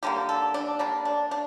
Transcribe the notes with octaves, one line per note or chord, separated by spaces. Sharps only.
D3 G3 A#3 G4
A4
D4
D3 G3 A#3 D4
D4
D4